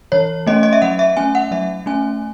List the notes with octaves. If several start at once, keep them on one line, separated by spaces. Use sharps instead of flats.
E3 C#5
A3 C#4 D#5
D#5
E5
F#3 F#5
E5
A3 C#4 G#5
F#5
F#3 E5
A3 C#4 G#5